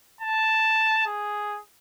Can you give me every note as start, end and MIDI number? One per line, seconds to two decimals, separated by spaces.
0.21 1.02 81
1.06 1.61 68